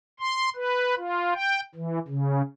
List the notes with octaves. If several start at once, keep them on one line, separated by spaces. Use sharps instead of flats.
C6
B4
F4
G5
E3
C#3